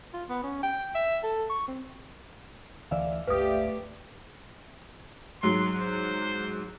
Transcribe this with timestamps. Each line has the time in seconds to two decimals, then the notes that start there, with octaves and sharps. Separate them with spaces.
0.13 F4
0.29 B3
0.43 C#4
0.63 G5
0.95 E5
1.23 A4
1.50 C#6
1.68 C4
2.91 D2 E3 D5 E5 F5
3.27 G1 C#2 A3 G4 B4 D#6
5.43 G#2 F#3 C6
5.79 C5